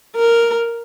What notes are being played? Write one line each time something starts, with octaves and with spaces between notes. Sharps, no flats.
A#4